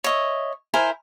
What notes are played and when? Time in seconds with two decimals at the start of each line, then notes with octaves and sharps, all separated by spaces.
0.04 C#5 D#5 E5
0.74 E4 A#4 C5 G#5